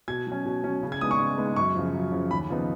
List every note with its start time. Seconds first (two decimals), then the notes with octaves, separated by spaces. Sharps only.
0.08 B2 G#6
0.27 F#3 C#4
0.46 B2
0.64 F#3 C#4
0.83 C#3
0.92 G#6
1.01 G#3 B3 D#4 D#6
1.11 C#6
1.20 C#3
1.38 G#3 B3 D#4
1.56 F#2 C#6
1.75 C#3 F3
1.94 F#2
2.12 C#3 F3
2.31 D#2 B5
2.50 C#3 F3 B3 D#4